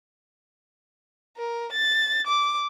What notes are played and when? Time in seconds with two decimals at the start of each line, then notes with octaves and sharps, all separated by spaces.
1.37 A#4
1.72 A6
2.27 D6